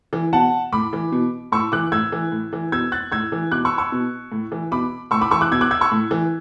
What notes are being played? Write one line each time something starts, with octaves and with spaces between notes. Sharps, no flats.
E3
B2 F#5 A5
A2 B5 D6
E3
B2
A2 C#6 E6
E3 D6 F#6
A2 E6 G#6
E3
A2
E3
B2 E6 G#6
F#6 A6
A2 E6 G#6
E3
B2 D6 F#6
C#6 E6
C#6 E6
B2
A2
E3
B2 B5 D6
A2 C#6 E6
B5 D6
E3 C#6 E6
D6 F#6
B2 E6 G#6
D6 F#6
E6 G#6
C#6 E6
A2
E3